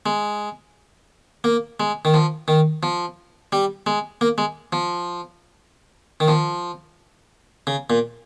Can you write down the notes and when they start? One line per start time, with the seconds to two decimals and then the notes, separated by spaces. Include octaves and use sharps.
0.06 G#3
1.44 A#3
1.80 G#3
2.05 D#3
2.14 F3
2.48 D#3
2.83 F3
3.52 G3
3.87 G#3
4.21 A#3
4.38 G#3
4.73 F3
6.20 D#3
6.28 F3
7.67 C#3
7.90 A#2